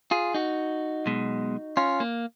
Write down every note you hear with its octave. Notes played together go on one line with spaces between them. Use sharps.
F4 G#4
D#4 F#4
B1 B2 G#3
C#4 F4
A#3